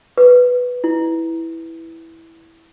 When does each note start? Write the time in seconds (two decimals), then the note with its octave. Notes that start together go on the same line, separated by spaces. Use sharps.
0.18 B4
0.84 E4